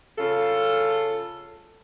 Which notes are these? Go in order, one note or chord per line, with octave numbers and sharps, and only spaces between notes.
C#3 F4 A4 F5